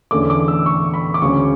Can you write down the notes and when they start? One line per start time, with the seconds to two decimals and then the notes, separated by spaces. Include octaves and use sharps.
0.11 E2 D3 A3 C#4 D6
0.30 D6
0.48 E6
0.66 C#6
0.94 B5
1.14 D6
1.22 D2 C#3 G#3 C#4 C#6